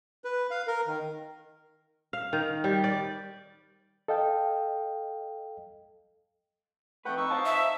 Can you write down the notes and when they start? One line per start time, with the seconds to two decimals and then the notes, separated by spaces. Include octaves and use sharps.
0.24 B4
0.51 F5
0.68 A#4
0.87 D#3
2.13 F5
2.33 D#3
2.64 G3
2.84 D5
4.08 A4 D#5 F5 G5
7.05 F2 A3 B4 F#5 G5
7.17 D#4 C#6 E6
7.30 C5 F5 A5
7.46 E5